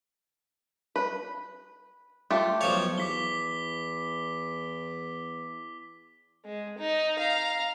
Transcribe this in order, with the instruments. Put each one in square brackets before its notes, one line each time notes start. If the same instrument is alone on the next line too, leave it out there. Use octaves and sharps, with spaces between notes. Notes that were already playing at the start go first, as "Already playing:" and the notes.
[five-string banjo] B4
A3 F4 G4
[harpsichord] B1 F3 C#5
[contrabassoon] E2 [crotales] D6 B6 G7
[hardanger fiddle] G#3
D#4
F5 A#5